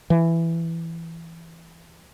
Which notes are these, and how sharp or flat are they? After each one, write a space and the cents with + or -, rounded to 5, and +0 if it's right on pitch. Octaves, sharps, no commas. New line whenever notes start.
E3 +10